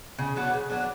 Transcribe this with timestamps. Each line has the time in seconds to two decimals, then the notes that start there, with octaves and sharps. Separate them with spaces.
0.18 C#3
0.36 F#3 B3 D4
0.53 C#3
0.70 F#3 B3 D4